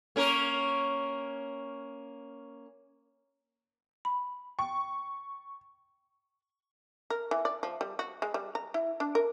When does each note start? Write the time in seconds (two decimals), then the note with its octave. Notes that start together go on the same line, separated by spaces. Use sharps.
0.16 A#3 C#4 A#4
4.05 B5
4.59 G5 C#6
7.10 A#4
7.31 E3
7.45 D5
7.63 F3
7.81 G3
7.99 F#4
8.22 G#3
8.34 G3
8.55 A#5
8.74 E4
9.00 D4
9.15 A#4